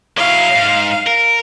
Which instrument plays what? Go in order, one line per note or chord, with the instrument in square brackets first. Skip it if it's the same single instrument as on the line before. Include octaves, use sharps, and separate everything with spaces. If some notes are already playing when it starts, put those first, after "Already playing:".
[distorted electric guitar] F#3 E4 [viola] F5
[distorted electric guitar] G#2
A#4